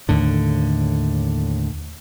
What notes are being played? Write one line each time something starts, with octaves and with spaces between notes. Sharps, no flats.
D#2 A2 D3